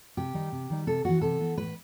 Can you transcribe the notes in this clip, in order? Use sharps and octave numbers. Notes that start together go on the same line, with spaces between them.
C3 G4
D#3 G3 D#4
C3
D#3 G3 D#4
C3 A4
E3 B3 F#4
C3 A4
E3 B3
A2 B4